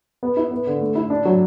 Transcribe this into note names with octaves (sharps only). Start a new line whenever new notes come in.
B3
E4
B3
D3
A3
E4
D4
F#3